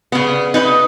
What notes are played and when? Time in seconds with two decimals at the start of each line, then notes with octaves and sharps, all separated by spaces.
0.12 C#3 B3
0.54 D#4 B4 D#5